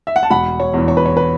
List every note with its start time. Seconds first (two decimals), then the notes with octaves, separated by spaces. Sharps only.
0.07 E5
0.16 F#5
0.23 A5
0.30 E1 F#5 B5
0.60 C#5
0.74 E2 E3
0.88 C#5
0.97 B4
1.06 C#5
1.17 B4